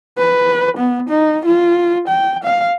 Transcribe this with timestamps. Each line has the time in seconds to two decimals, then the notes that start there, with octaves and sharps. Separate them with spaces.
0.18 B4
0.78 B3
1.09 D#4
1.46 F4
2.08 G5
2.44 F5